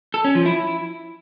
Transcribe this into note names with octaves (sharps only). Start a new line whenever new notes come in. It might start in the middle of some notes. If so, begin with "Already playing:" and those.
A4
C#4
F3
E4